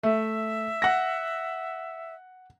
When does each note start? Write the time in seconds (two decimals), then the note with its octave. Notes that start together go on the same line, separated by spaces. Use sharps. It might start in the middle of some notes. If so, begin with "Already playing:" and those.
0.03 A3 E5
0.82 F#5 A#6